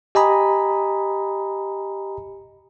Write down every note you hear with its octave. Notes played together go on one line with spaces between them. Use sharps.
G4 D#5 G#5 A#5 B5 D#6